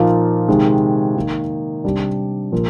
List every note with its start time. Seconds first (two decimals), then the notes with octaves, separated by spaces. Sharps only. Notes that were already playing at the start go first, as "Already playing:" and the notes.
Already playing: A#2 F3 A#3 D#4
0.48 C3 D#3 G#3
1.16 D#3 A#3 D#4
1.84 C3 G3 D4
2.52 A#2 F3 A#3